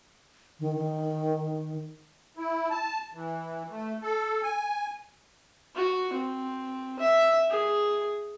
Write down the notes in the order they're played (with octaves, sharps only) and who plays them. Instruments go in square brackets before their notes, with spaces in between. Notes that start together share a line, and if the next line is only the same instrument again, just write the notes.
[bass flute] D#3
D#3
[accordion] E4
A5
E3
A3
A4
G#5
[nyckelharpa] F#4
C4
E5
G#4